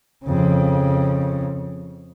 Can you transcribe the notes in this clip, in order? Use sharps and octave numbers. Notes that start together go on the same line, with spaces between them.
F2 C#3